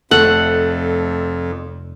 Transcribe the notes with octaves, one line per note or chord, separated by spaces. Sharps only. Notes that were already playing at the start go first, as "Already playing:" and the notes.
F1 F2 A3 A4 F#5